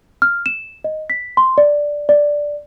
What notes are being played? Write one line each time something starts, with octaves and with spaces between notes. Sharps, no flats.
F6
E7
D#5
B6
C6
D5
D5